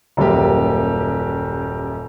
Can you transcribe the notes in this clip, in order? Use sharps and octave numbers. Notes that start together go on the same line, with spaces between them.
D#1 F#2 A#3 G4